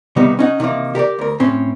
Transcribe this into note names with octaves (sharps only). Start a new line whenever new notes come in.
C3 D#3 G3 B3 D#4
C#4 D#4 F#5
C3 D#3 E3 A#3
G4 A#4 C#5 D5
D2 A#4
A2 C4 C#4